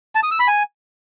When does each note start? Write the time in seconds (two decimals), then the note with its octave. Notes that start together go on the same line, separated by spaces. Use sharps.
0.15 A5
0.23 D#6
0.31 E6
0.39 B5
0.48 G#5